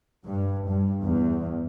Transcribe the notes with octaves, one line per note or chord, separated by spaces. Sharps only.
G2
G2
E2